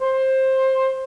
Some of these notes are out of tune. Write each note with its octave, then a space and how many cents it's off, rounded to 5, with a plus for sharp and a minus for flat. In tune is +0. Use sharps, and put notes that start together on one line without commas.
C5 +15